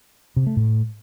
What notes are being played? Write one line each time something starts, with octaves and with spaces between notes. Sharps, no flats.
C3
A3
A2